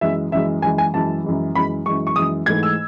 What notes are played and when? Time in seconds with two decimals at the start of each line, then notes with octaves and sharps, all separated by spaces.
0.01 F#2 E3 G#3 E5
0.32 F#2 E3 G#3 E5
0.62 F#2 E3 G#3 G#5
0.78 G#5
0.94 F#2 E3 G#3 A5
1.24 F#2 E3 G#3
1.55 F#2 E3 G#3 B5
1.86 F#2 E3 G#3 C#6
2.07 C#6
2.16 F#2 E3 G#3 D#6
2.46 G#2 E3 A3 G#6
2.63 E6